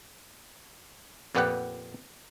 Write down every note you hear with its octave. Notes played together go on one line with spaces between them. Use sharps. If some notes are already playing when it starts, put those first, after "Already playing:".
F2 A#2 B3 G4 B4 F#5